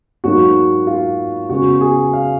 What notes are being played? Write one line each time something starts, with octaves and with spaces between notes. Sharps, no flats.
G#2 F#3 A#3 D#4 F#4
F4
C#3 G#3 B3 F#4
G#4
F5